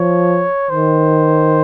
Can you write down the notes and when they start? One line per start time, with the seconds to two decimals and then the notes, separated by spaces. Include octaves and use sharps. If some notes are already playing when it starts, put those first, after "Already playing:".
Already playing: F3 C#5
0.70 D#3 C5